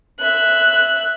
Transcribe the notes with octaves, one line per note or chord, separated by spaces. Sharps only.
E5 F#6